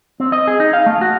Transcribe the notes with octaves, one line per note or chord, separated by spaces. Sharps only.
C4
D#5
G#4
D#4
F5
A3
F#4